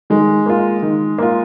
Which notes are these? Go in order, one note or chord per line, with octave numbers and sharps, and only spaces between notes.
D#3 G#3
A#3 F4
D#3
A#3 F4